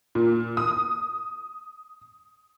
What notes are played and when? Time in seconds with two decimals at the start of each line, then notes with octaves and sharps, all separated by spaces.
0.15 A#2
0.57 D#6